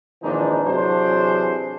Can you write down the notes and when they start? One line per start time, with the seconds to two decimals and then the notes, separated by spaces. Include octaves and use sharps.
0.23 G#1 A#2 E3 F3 D4 D#4
0.65 C3 E3 F#3 D4 G#4 C5